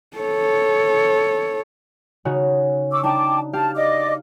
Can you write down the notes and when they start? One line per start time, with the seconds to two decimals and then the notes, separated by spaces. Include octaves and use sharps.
0.17 A4 C#5
2.25 C#3 D#4 F#4
2.91 C#6 D6 E6
3.03 D4 D#4 G5 A5 D6
3.53 G4 F5 A5
3.75 D5 D#5 D6